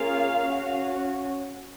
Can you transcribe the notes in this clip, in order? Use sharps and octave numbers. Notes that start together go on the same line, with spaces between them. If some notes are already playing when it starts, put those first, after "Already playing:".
Already playing: A#3 C#4 F4 G#4 F5
C#4 F#4